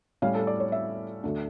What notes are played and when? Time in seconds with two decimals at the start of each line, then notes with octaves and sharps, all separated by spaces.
0.22 A2 G3 C#4 F5
0.35 A4
0.47 D5
0.60 C#5
0.72 E5
1.24 D2 D3 A3 D4